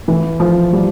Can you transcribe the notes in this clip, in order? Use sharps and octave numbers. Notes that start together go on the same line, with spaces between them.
E3
F3
G3